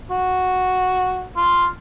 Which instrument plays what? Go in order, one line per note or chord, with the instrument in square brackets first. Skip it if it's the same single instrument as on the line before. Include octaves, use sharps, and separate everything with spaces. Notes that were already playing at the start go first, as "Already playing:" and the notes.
[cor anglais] F#4
F4